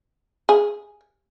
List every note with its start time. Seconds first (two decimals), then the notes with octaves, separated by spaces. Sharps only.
0.49 G#4